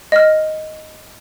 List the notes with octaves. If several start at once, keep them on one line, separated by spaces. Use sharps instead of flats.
D#5 F6